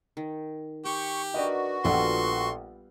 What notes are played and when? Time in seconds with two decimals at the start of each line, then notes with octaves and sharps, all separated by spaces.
0.17 D#3
0.85 G4 G5 C#6
1.34 D4 F#4 A#4 B4 D#5
1.85 A#1 G3 B3 F4 A4 F#5 C6 C#6